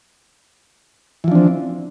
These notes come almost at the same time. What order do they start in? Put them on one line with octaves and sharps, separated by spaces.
E3 F3 D4 C4